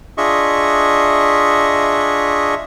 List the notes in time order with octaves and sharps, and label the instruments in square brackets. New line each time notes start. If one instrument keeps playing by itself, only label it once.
[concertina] D4 F4 G#4 D#5 E5 C#6